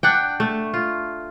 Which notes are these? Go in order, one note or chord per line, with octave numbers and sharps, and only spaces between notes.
D4 F#5 G5
A3
F4